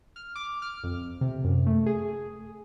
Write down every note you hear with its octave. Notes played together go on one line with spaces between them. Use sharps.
F6
D6
F6
F2
C3
F#2
A3
G#4